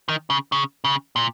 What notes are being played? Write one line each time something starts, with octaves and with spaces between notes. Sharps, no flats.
D#3
C#3
C#3
C#3
A#2